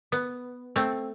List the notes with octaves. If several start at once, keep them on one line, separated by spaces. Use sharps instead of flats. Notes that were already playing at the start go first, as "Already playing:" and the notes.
B3
A3 C4